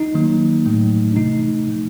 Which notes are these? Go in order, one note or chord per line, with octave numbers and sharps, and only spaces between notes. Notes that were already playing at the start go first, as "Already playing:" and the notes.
Already playing: D#4
D#3 F#3 A#3
A2 F#3 A3
D4
C3 E3 A3 D#4
A#2 F3 A3